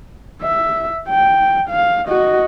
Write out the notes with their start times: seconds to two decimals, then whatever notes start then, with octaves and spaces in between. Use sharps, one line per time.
0.43 E5
1.09 G5
1.70 F5
2.08 F#4 D#5